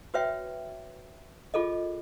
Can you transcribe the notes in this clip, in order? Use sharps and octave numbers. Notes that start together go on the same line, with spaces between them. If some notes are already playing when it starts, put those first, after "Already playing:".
F#4 B4 C#5 E5 G5
F4 G#4 A4 D#5